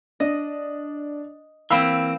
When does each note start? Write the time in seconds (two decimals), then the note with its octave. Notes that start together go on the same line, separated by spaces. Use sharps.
0.20 D4 D#5
1.70 E3 A#3 C4 F5 G5 B5 E6